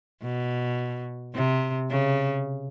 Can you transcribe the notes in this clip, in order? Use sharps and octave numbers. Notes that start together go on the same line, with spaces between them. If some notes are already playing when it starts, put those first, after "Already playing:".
B2
C3
C#3